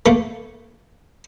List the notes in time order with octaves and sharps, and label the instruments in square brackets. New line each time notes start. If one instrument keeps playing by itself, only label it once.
[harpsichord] A3 A#3